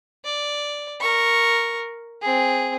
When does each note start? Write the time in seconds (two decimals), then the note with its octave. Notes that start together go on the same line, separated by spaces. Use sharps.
0.25 D5
1.00 A#4 C#6
2.21 C4 G#4